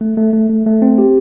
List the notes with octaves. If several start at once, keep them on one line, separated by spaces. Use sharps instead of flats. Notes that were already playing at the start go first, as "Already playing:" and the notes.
A3
A3
A3
A3
A3
C4
G4